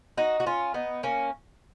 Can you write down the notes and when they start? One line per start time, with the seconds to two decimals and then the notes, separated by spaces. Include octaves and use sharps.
0.18 D#4 F#4
0.40 F#4
0.46 C#4 F4
0.74 B3 D#4
1.03 A#3 C#4